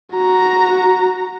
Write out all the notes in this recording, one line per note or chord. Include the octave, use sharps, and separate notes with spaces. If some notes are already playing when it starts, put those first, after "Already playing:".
F#4 A#5